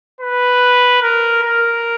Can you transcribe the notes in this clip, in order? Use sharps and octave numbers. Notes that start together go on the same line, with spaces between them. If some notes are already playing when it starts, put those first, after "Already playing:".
B4
A#4
A#4